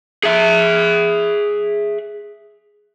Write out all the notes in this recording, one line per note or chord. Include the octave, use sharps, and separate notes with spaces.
G#4 E5